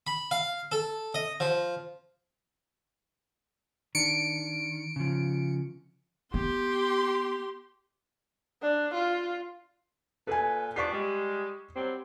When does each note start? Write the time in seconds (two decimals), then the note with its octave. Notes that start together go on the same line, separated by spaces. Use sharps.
0.07 B5
0.31 F5
0.72 A4
1.14 D#5
1.40 F3
3.95 D#3 D4 C#7 D7
4.96 C#3 F3
6.34 B3 G4 C6
8.62 D4
8.94 F4
10.27 A#2 A4 B4 G#5
10.76 F3 B3 D4 C#6 B6 C7
10.92 G3 G#3
11.76 F#3 G3 C4